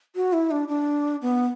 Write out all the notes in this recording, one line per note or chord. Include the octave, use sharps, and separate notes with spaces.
F#4
E4
D4
D4
B3